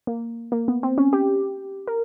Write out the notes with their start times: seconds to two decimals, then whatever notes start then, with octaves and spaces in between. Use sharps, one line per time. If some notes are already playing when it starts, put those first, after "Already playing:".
0.07 A#3
0.52 A#3
0.68 B3
0.83 C4
0.98 C#4
1.13 G4
1.87 A#4